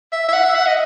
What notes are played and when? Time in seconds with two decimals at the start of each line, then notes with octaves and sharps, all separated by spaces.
0.12 E5
0.28 E5
0.33 F#5
0.44 E5
0.55 F#5
0.67 D#5